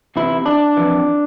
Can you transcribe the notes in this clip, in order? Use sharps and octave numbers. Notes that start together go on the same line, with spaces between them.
E2 C3 E3 E4
D4
F2 E3